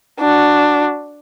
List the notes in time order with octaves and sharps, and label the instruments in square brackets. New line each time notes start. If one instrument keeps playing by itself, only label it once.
[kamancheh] D4 F#4